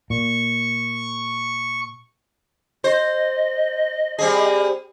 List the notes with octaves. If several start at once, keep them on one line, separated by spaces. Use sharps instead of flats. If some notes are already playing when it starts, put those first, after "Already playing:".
A#2 C#6
C5 D#5
G3 C4 G#4